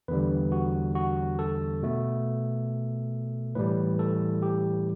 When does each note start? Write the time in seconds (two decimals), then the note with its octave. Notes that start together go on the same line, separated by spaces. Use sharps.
0.08 E2 D3 G3 B4
0.52 F#4
0.95 F#4
1.39 A4
1.83 B2 A3
3.55 A2 E3 G3 B4
3.99 A4
4.42 G4